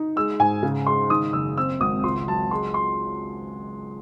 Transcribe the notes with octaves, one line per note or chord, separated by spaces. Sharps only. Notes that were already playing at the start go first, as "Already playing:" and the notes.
Already playing: D#4
G#3 E6
G#2 G#5
C#3
G#3 C6
D#3 D#6
F#1 E6
C4 E6
G#1 D#6
C#2 C6
F#3 A5
G#3 C6
C6